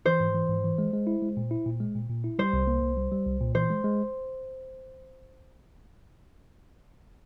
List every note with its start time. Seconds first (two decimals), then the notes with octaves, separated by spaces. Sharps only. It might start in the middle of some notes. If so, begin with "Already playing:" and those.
0.06 E3 C5
0.20 G#2
0.35 E3
0.49 G#2
0.64 E3
0.78 G#3
0.93 G#3
1.07 E4
1.22 G#3
1.37 A#2
1.51 E4
1.66 A#2
1.80 G#3
1.95 A#2
2.09 A#2
2.24 E4
2.39 G3 C5
2.53 C2
2.67 A#3
2.83 C2
2.97 G3
3.12 G3
3.26 C2
3.41 A#2
3.55 E3 C5
3.70 G#3
3.84 G#3